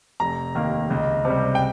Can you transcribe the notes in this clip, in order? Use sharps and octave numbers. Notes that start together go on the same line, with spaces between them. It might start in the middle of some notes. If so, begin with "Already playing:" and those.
F1 A#5
D#2 D#3 A#3
C#2
C3 G3
G5